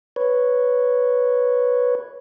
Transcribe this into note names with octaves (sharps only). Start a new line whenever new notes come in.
B4 C#5